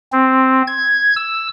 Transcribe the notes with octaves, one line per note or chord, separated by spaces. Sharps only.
C4
G#6
E6